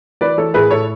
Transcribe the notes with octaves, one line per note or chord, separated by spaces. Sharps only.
E3 B4 D5
E3 A4 C#5
A2 G#4 B4
A2 A4 C#5